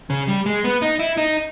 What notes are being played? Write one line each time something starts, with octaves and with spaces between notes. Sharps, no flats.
C#3
G3
G#3
B3
D#4
E4
D#4